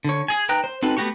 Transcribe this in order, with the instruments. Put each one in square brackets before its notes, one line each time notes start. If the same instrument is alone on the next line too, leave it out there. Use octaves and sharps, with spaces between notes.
[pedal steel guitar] D3 C#5
G#4 G#5
D#4 B4 G5 A#5 F#6
C5
C4 D#4 F#4 A4 B4
A3 B3 F#4 G4 C#6